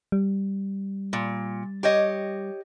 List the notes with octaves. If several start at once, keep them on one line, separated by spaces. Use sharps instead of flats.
G3
A#2
G4 C#5 D#5